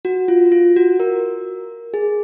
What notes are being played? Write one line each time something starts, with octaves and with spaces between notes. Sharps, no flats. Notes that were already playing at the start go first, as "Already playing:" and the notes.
F#4
F4
F4
F#4
A#4
G#4